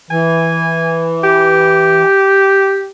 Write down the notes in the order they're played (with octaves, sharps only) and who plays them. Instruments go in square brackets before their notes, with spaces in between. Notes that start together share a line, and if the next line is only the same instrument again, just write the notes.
[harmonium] E3 [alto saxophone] G#5
[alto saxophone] G4